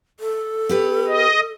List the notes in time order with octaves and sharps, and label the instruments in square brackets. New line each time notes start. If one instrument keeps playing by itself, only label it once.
[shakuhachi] A4
[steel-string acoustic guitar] B3 G4 B4
[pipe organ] D#5